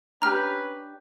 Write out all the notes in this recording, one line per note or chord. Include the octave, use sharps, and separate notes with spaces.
C#4 D4 G4 B4 A#5 F6